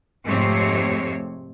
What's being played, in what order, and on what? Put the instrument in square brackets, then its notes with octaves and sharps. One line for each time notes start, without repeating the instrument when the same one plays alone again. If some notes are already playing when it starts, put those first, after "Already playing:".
[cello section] F2 G#2 C3 A3 C4 C#5